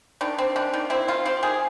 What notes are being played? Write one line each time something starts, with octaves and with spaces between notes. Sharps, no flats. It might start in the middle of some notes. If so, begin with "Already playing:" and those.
D#3 D4
C4
D#3 D4
D#3
C4 E4
D#3 F4
C4 G4
D#3 G#4